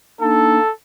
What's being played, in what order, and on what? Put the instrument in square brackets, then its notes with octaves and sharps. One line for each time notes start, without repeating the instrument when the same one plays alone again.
[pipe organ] A#3 D4 D#4 [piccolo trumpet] A4